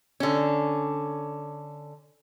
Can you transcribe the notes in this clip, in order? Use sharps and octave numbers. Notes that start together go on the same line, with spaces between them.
D3 C#4